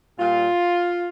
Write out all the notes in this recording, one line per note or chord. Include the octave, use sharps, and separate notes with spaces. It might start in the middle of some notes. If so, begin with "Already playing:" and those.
A#2 G3 F4